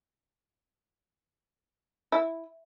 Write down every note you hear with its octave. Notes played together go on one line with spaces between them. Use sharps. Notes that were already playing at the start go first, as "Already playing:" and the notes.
E4